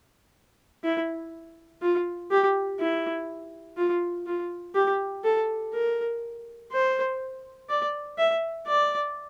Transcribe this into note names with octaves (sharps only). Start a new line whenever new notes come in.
E4
F4
G4
E4
F4
F4
G4
A4
A#4
C5
D5
E5
D5